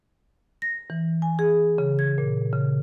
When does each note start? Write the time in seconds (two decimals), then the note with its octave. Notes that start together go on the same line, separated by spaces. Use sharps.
0.62 A#6
0.90 E3
1.22 G#5
1.39 G#4
1.78 C#3
1.99 G#6
2.18 A#2
2.53 C#3